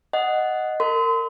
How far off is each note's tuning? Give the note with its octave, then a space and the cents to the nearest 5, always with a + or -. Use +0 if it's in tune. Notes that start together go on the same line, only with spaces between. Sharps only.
D#5 +0 F#5 +5
A#4 -30 C6 -35